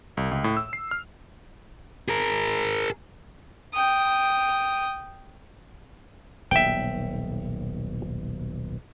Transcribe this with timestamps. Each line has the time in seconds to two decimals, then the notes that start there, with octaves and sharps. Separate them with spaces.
0.17 C2
0.31 C#2
0.44 A2
0.57 E6
0.73 C7
0.91 F6
2.09 G#4 A#4
3.74 G5 D#6
6.51 D#1 B1 E5 G5